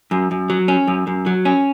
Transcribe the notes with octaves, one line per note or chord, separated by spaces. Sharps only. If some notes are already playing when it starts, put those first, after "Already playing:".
F#2
F#2
F#3
C#4
F#2
F#2
F#3
C#4